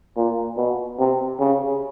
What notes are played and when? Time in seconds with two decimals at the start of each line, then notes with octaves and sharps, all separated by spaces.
0.16 A#2
0.57 B2
0.99 C3
1.40 C#3